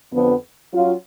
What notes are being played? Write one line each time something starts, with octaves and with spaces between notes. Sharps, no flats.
F2 D3 F3 B3
F#3 C#4 F4